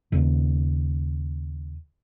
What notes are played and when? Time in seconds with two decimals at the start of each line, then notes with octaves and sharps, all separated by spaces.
0.12 D#2 C#3